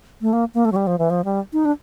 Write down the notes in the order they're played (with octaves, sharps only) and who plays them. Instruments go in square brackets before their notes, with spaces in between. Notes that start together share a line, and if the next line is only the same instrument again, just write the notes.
[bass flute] A3
A#3
A#3
A3
F#3
G3
F3
E3
F3
G3
D#4
D4